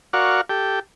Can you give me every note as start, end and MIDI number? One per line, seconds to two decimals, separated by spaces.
0.13 0.41 66
0.13 0.41 70
0.13 0.41 74
0.13 0.41 77
0.13 0.41 78
0.13 0.41 85
0.50 0.79 67
0.50 0.79 69
0.50 0.79 79